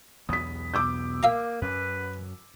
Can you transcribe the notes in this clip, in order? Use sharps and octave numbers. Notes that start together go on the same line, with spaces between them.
B1 E2 B3 D#6 B6
B2 D6 E6 G6
A#3 E5 F5 A#5
F#2 C#4 B4